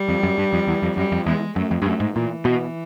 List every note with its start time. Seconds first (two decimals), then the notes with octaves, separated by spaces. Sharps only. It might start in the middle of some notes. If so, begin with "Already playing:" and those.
Already playing: G3
0.09 F2
0.23 F#2
0.38 G2
0.53 F2
0.67 E2
0.82 F2
0.97 F#2 G3
1.12 F2
1.26 E2 G#3
1.56 F#2 A3
1.71 F2
1.82 G2
1.86 F#2 A3
2.00 G#2
2.15 A#2 E3
2.45 B2